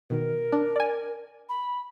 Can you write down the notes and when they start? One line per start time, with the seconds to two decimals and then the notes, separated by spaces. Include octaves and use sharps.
0.10 B2 D#3 A#4
0.52 D4
0.76 D5 G#5
1.49 B5